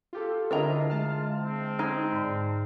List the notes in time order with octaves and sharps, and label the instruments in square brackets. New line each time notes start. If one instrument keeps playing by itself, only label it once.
[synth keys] F4 G4 A4
[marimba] D3 [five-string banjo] D4 E4 A#5 [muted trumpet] F4 [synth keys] A#4 D#5
[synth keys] G#3 A5 F6
[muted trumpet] C4
[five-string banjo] D#4 [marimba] G#6
[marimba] G#2 D5